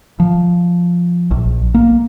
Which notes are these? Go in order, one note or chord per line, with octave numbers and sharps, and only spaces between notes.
F3
A#1
A#3